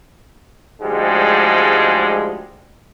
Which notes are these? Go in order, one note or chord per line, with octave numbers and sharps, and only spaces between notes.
D2 G#2 F3 G3 G#3